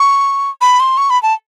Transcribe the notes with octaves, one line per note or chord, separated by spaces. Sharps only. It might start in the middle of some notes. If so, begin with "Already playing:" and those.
Already playing: C#6
B5
C6
C#6
B5
A5